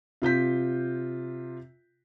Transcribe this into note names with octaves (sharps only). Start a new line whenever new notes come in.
C3 F4 G6 B6